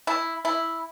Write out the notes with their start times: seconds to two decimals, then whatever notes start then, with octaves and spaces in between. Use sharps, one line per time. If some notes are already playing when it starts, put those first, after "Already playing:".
0.07 E4
0.45 E4